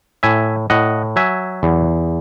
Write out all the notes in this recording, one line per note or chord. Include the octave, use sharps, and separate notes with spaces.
A2 E5 G#5
A2 D#5 F#5
F#3 E5 G#5
E2